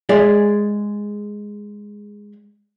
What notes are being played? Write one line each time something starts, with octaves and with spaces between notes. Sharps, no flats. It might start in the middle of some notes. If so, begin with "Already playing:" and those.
G#3 G#4 D5 E5